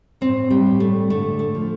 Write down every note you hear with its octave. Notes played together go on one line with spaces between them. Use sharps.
A2 C4
G3
A2
A3
D3 A3
A3
F3